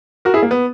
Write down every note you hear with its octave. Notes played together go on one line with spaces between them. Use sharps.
F#4 A#4
E4 G#4
A#3
B3